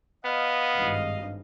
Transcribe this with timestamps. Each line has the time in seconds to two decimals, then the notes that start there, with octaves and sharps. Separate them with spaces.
0.25 B3 D#5 F5
0.74 G#1 G2